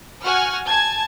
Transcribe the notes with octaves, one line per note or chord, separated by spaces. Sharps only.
F#4 F#5 G#5 F6
G#5 A5 G#6